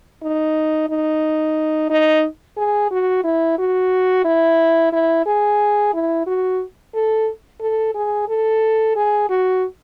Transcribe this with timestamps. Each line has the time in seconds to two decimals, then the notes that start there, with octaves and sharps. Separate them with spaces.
0.22 D#4
0.90 D#4
1.90 D#4
2.57 G#4
2.91 F#4
3.24 E4
3.58 F#4
4.25 E4
4.93 E4
5.26 G#4
5.94 E4
6.27 F#4
6.94 A4
7.61 A4
7.95 G#4
8.28 A4
8.96 G#4
9.29 F#4